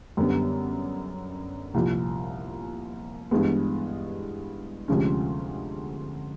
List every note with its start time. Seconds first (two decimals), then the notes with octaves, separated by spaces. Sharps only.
0.17 F#2 D3 G3 B3
1.74 C2 A#2 F3
3.31 G2 E3 G#3 B3
4.88 D2 C3 F3 G#3 C#4